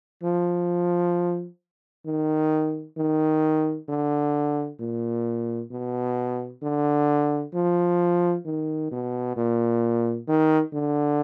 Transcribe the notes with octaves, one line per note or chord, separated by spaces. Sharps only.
F3
D#3
D#3
D3
A#2
B2
D3
F3
D#3
B2
A#2
D#3
D3